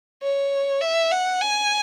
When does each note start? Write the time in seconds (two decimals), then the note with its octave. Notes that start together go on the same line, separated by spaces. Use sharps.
0.23 C#5
0.81 E5
1.12 F#5
1.41 G#5